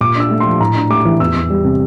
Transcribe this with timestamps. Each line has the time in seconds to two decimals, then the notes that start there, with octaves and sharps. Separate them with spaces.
0.01 A#2 D6
0.15 D4 E6
0.31 A3
0.40 F3 C6
0.60 A2 A#5
0.75 D4
0.90 A3 D6
1.05 E3
1.20 E2 E6
1.35 E2
1.50 G3
1.64 C3